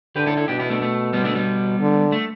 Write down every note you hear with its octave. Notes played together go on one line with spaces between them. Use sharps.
D3 G4 B4
E4 A4
E4 A4
B2 D4 G4
B3 E4
A3 D4
A3
G3 B3
A3 D4
G3 B3
D3
A3